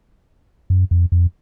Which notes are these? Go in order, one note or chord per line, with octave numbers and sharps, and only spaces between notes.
F#2
F2
F2